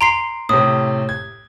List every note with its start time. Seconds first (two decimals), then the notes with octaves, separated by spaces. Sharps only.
0.01 A#5 C6 C7 D7
0.49 A2 C3 D#6
1.09 G#6